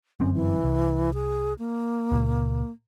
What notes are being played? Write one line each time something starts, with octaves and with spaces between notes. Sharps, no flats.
G1 F#2 C4 C#4
E3
C2
G#4
A#3
C#2 A#2